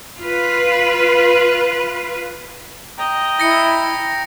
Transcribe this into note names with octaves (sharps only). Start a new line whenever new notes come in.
F4 B4
D#5 G5 A#5
E4 A#6 C#7